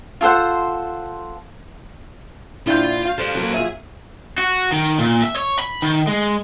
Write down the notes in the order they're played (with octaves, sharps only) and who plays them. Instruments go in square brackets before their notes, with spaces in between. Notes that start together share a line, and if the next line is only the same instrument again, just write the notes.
[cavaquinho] F4 A4 C5 F#5
[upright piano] A#1 D4 G6 [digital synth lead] E4 [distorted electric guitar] F4 F5
[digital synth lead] F5
[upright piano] G3 [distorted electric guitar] A4 C5
[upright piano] F#3 A#3
[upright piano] F#3 F4 E5 [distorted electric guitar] G#4
[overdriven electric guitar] F#4
D#3
A#2
E5
C#5
B5
D#3
G#3